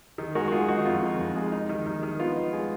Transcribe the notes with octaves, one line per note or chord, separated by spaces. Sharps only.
D#3
G#3 F#4 A#4
F#4
G#3 F4 G#4
D#3 D#4 F#4
F2 F4
D#3
F2
G#3
D#4
D#3
D#3
D#3
B3 F4
D#4
G#3